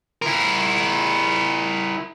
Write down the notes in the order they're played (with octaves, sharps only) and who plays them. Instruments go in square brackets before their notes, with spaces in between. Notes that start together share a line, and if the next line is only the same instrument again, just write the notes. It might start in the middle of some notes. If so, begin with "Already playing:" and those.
[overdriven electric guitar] E4 A#4